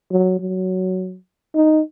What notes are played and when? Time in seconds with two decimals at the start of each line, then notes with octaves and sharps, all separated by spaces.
0.12 F#3
0.39 F#3
1.55 D#4